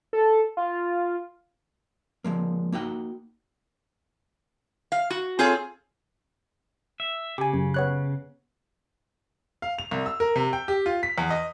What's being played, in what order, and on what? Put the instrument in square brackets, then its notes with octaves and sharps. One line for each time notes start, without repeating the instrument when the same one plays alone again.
[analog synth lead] A4
F4
[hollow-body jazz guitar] F3 G#3 A#3
A#3 D#4 F#4 G5
[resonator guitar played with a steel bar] F5
F#4
C4 F4 G#4 A4 C#5
[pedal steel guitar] E5
[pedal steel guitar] C#3 [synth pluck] G4 G#5
[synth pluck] F#2
B3 C#5 F#6
[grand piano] F5
F7
C2
E6
A#4
C3
G5
G4
F4
B6
E2
D#5